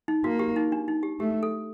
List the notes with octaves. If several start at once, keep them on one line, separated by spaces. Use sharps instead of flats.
D#4
A#3 F#4
G4
D#4
D4
D#4
G4
A3 G4
A4